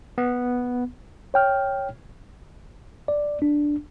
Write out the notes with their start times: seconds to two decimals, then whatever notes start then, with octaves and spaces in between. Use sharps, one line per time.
0.18 B3
1.34 C#5 G5 F6
3.08 D5
3.42 D4